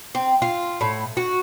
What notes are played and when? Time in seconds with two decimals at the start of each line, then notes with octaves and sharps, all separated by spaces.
0.15 C4
0.42 F4
0.81 A2
1.17 F#4